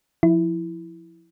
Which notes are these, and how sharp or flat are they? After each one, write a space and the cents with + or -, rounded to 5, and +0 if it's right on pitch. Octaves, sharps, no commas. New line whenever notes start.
F3 +0 E4 +0